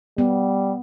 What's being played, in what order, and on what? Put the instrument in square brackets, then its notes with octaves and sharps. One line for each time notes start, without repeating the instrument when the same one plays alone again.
[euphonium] G3 [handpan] B3